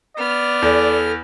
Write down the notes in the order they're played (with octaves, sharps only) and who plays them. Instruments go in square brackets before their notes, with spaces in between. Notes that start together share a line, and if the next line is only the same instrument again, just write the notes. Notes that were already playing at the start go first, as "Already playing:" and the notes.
[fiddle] B3 F6 [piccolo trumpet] D5
[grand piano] E2 [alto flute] A4